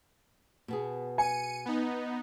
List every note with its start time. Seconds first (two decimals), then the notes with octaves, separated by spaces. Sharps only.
0.68 B2 B3 G#4
1.18 G#5 C#7 D#7
1.65 B3 D#4